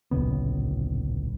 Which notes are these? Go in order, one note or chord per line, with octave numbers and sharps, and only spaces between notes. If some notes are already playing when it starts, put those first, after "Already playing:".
D1 A#1 C#3 B3